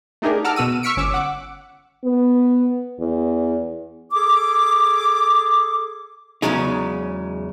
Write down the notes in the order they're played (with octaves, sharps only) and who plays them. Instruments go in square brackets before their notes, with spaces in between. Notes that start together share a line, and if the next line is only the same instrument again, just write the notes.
[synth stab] A3 D4 D#4 G4 G#4 A#4
F#5 A5 A#5 D6 E6 F6
B2 B3 F#4 E6 D#7
C#6 E6 F6 B6 C#7 D7
G1 C#4 D6 E6
F#5 D6
[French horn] B3
E2
[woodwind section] G#4 A4 D6
[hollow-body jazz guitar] E2 A2 C#3 F#3 G#3 D#4